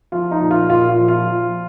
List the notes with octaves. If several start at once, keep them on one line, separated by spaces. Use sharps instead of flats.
F3 F4
D#4
A#2
F4
A#2 F4
F4
F3
F4
F3